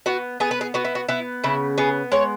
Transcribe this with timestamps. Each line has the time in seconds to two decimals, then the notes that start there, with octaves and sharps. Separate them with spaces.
0.06 B3 F#4
0.40 B3 G#4
0.51 B4
0.61 G#4
0.74 B3 F#4
0.85 E4
0.95 F#4
1.09 B3 E4
1.44 C#3 E4
1.78 B3 G#4
2.12 G#3 C#5